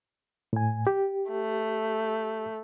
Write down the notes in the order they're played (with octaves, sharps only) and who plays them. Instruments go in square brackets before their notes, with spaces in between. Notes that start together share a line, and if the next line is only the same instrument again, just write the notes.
[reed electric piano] A2 G#5
G4
[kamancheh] A3